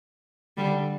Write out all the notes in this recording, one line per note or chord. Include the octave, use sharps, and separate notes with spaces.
D3 G3